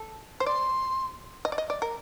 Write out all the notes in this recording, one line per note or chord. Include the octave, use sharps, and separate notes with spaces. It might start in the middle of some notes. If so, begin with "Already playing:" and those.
Already playing: A4
C5
D5 C6
D#5
D5
D#5
D5
A#4